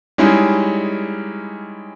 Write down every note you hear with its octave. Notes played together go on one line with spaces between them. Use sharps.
G3 G#3 C#4 D#4 E4 G#4